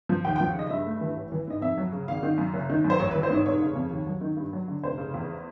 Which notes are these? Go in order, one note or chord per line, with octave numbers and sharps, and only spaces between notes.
F3
D#2 G5
G5
F3
F#5
C#3 D#5
D#5
G2 E5
A3
E3
A1
E3
G#2 D#5
F2 E5
F#3
C#3
G#1 F5
D#3
F#2
F#1
D#3
F#2
C5
A1 C#5
B4
E3
C5
G#2 C#5
F1 C#5
C#3
F2
D#2
F#3
D#3
G2
F#3
D3
F1 C5
C#3
E2